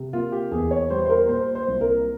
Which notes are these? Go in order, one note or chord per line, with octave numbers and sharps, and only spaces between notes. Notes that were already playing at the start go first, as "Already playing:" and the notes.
Already playing: C3
A#3 F4
G4
E2 G#4
C#5
G3 C5
C5
A#4
A#2 C5
C5
C2
A#4